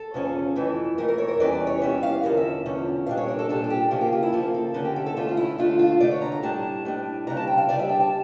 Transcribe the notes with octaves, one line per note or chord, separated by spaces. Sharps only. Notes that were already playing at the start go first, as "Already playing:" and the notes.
Already playing: A4
E2 C#3 F3 C#4
F2 E3 A3
F2 E3 A3 A#4
A#4
C#5
A#4
E2 E3 G3 C#4 D5
D5
C#5
E2 E3 G3 C#4 E5
F5
E2 D3 F3 C#4 A#4
E5
E2 D3 F3 C#4
A#2 G3 D4 F5
C#5
A#4
A4
A#2 G3 D4 A4
A4
G4
C#3 F3 A#3 F4
G4
F4
E4
C#3 F3 A#3 F4
A4
D3 A3 C#4 A#4
G4
A4
A4
D3 A3 C#4 F4
F4
E4
D3 A3 D4 F4
F4
D3 A3 D4 D5
C#5
A#5
A#5
A2 G3 D4 A5
A2 G3 D4
C#3 G3 D4 A#5
A5
G5
F5
C#3 G3 D4 D5
E5
G5
A5